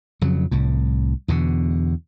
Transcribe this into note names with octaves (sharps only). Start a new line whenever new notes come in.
F2 C#3 F#3
C2 A2
E2 B2 D3